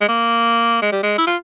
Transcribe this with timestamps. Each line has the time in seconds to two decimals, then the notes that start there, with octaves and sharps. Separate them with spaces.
0.01 G#3
0.09 A#3
0.82 G#3
0.92 G3
1.03 G#3
1.18 E4
1.27 F4